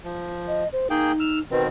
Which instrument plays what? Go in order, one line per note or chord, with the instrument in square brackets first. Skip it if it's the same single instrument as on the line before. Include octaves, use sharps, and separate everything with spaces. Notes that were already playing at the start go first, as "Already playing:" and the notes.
[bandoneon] F3
[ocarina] D#5
C5
[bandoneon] A#3 G#4 G5 [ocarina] D#4
[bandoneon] E6 F6
[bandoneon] B2 D#3 C4 [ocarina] B4